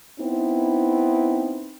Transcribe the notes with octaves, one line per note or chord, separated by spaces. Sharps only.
B3 C4 D#4 E4